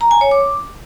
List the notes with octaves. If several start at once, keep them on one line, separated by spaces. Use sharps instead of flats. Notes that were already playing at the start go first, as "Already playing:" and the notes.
A#5
G#5
C#5
D6